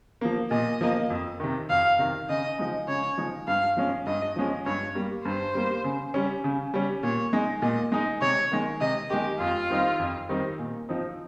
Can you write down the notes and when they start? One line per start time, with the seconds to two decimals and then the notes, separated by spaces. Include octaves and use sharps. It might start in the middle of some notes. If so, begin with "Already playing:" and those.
0.21 F3 A#3
0.51 A#2 D#5
0.81 F3 A#3
1.10 F2
1.40 C3 D#3
1.70 F2 F5
1.99 C3 D#3
2.29 C#3 D#5
2.58 F3 G#3 D#4
2.88 C#3 C#5
3.18 F3 G#3 D#4
3.48 G2 F5
3.77 F3 G#3 C#4
4.07 G2 D#5
4.36 F3 G#3 C#4
4.66 G2 C#5
4.95 G3 A#3
5.25 G2 C5
5.55 G3 A#3
5.84 C#3
6.14 G3 C#4
6.44 C#3
6.74 G3 C#4
7.03 A#2 C#5
7.33 G#3 D#4
7.62 A#2 D#5
7.92 G#3 D#4
8.21 C3 C#5
8.52 D#3 G#3
8.81 C3 D#5
9.10 D#3 G#3 G4
9.40 F2 F4
9.70 D#3 G3 C4 D#4
9.99 F2
10.29 D#3 G3 C4 D#4
10.59 A#2
10.89 F3 C4 D#4